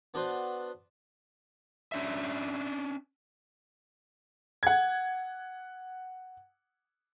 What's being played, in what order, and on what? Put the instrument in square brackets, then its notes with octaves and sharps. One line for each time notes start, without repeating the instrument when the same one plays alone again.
[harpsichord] B3 D4 F#4 B4 C5
[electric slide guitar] C#4 D4 E5
[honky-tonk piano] F#5 G#6